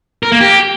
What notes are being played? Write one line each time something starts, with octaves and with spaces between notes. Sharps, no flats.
A#4
A#3
G4